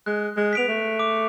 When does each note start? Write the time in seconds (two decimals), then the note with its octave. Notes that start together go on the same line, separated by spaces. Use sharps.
0.06 G#3 F#6
0.37 G#3
0.53 B3 B6 D7 F7
0.68 A3
0.99 D6